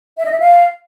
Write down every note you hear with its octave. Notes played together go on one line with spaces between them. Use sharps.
E5
D#5
E5
F5